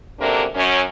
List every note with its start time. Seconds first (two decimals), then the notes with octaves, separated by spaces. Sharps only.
0.18 F#2 C3 A#3 D4 A4 A#4
0.55 F#2 C#4